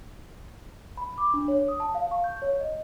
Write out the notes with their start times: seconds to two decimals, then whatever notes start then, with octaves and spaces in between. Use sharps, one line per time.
0.97 B5
1.18 D6
1.34 D4
1.48 C#5
1.68 D#6
1.80 A5
1.95 F5
2.11 C#6
2.24 G6
2.42 C#5
2.60 D#5